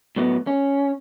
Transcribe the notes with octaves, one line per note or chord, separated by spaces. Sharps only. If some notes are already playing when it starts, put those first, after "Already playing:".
A2 F#3 B3
C#4